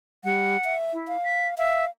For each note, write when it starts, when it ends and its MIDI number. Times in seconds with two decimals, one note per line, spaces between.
0.24 0.57 55
0.24 0.76 78
0.64 0.92 76
0.93 1.17 64
1.08 1.55 77
1.24 1.47 95
1.58 1.85 76
1.58 1.90 77